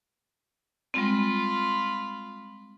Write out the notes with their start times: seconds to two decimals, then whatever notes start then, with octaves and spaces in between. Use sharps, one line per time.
0.94 G3 G#3 C4 F4 B5